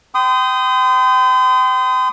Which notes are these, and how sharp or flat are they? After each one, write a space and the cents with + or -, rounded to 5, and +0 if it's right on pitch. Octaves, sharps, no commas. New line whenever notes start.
G5 -20 C6 -40 D#6 -5